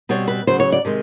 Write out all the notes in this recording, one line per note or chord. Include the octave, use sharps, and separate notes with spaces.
B2 G3 C4 C#5
B4
D2 C#3 F#3 C5
C#5
D5
C3 D#3 G#3